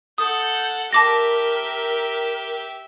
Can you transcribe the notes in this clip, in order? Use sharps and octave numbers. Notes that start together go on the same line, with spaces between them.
A4 F#5 D#6 G6
G4 A#4 E5 A5 D6 A#6